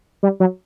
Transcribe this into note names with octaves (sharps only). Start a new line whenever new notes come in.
G3
F#3